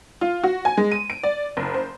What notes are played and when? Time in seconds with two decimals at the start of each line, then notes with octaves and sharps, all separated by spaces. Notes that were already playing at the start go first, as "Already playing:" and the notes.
0.21 F4
0.44 F#4
0.65 G#5
0.77 G#3
0.92 D#7
1.10 D7
1.23 D5
1.57 F#1
1.74 C5